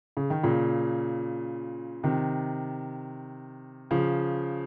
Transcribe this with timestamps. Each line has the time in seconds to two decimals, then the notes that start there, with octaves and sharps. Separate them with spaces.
0.17 C#3
0.30 D#3
0.43 A#2 C#3
2.04 C3 D#3
3.91 C#3 F3